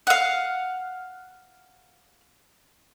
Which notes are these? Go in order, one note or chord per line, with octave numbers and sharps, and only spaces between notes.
F5 F#5